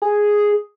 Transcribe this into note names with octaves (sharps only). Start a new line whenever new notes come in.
G#4